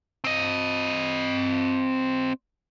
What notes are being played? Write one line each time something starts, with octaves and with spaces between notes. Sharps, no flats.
C4 D#5